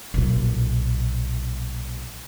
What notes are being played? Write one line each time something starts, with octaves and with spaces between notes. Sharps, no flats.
B1 A#2